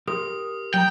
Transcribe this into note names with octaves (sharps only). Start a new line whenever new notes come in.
G4 A#4 C6 D#6
F#3 G5 A#5